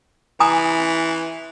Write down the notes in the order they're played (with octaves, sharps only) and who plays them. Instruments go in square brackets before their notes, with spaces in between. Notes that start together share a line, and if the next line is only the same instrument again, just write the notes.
[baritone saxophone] E3 [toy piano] G#5 A#5 D#6